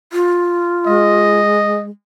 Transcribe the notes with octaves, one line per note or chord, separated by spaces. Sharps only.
F4
G#3 D#5